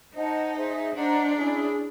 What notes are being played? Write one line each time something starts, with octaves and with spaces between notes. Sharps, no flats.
D#4 C5 D#5 F#5 A5
G#4 C5 E5
D4 C5 D#5 F#5 A#5
C#4 E4 G#4